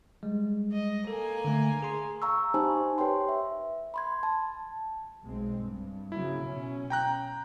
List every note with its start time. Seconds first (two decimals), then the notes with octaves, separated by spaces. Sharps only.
0.23 G3 G#3
0.72 D#5
1.07 A#3 A4 G#5
1.44 D3 A3
1.82 G#4 C6
2.22 F5 A#5 C#6 E6
2.54 D#4 G4 C5 G#5 A5 B5
2.98 G4 B4 C#5 G5 C6
3.29 E5
3.94 B5 C6 G#6
4.23 A5
5.23 B1 G#3 C4
5.60 G2
6.12 C#3 F#3 A#3 E4
6.42 B2 C#4
6.90 G5 A#5 F#6